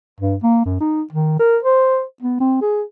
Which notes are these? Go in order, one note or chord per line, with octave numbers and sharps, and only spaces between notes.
G2
A#3
F#2
D#4
D#3
A#4
C5
B3
C4
G#4